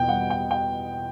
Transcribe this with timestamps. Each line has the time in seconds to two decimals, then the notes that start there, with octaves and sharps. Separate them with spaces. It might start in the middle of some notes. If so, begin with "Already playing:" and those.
Already playing: E2 B2 G5
0.09 G3 F#5
0.30 G5
0.51 G5